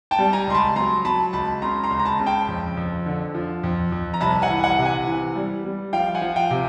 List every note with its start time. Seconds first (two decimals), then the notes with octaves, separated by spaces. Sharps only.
0.11 G5 A5
0.19 G3
0.33 G#5 A#5
0.47 C#2 C6
0.54 A5 B5
0.76 F#3 A#5 C6
1.05 F#3 A5 B5
1.33 C#2 A5 B5
1.62 C#3 A#5 C6
1.84 A#5 C6
1.90 C#2
1.99 A#5
2.05 A5 B5
2.20 C#3
2.26 G5 A5
2.48 F2
2.77 F2
3.06 D3
3.34 F3
3.63 F2
3.92 F2
4.14 A#5
4.21 C2 A5 B5
4.42 F#5 G#5
4.50 E3
4.63 F#5 G#5
4.78 C3
4.85 F#5 G#5
5.07 E3
5.36 G3
5.64 G3
5.93 F3 F5 G5
6.15 F#5 G#5
6.22 F3
6.36 F5 G5
6.51 C3